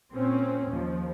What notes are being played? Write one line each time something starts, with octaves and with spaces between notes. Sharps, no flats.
A#2 C4 C#4
D#2 F3